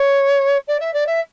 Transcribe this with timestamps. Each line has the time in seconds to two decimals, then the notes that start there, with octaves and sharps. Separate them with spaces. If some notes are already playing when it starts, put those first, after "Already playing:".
Already playing: C#5
0.67 D5
0.79 E5
0.93 D5
1.06 E5